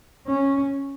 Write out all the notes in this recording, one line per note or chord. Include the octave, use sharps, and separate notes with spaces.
C#4